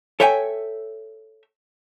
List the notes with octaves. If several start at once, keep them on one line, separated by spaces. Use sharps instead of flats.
A4 C#5 E5 G5 G#5